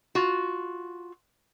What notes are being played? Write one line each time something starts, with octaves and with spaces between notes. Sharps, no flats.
F4 F#4